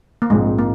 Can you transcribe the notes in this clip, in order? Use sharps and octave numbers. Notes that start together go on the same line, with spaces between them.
A#3
A#1 G#2 F3 G#3 C4
A#3